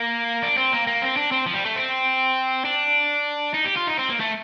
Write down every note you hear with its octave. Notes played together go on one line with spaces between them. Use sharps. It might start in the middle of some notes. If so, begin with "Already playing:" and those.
Already playing: A#3
D4
C4
A#3
A#3
C4
D4
C4
F3
G3
A3
C4
D4
D#4
G4
F4
D#4
C4
A#3
A3